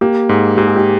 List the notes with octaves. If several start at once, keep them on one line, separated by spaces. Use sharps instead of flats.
A#3 G4
G#2 G#4
G#2 G4
G#4
G4